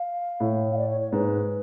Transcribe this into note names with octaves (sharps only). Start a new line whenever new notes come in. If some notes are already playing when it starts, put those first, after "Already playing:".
Already playing: F5
A2
F5
D5
C#5
C#5
G#2 B4